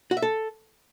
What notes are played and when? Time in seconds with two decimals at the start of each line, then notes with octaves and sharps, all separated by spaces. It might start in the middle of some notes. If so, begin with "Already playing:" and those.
0.11 F#4
0.17 E5
0.22 A4